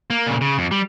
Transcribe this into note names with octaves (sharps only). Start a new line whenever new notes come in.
A#3
A#2 C#3
C#3
F2
G3